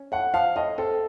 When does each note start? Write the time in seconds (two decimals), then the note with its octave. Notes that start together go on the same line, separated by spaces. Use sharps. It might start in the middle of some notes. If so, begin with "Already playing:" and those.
Already playing: C#4
0.12 A2 F#5
0.34 F3 F5
0.56 A2 D#5
0.78 C4 A4